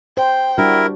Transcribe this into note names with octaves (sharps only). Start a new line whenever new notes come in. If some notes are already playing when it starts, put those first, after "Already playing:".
C5 G5
G3 D4 E4 F#4 A#4